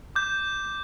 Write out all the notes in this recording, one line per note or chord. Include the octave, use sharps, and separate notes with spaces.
D6 G6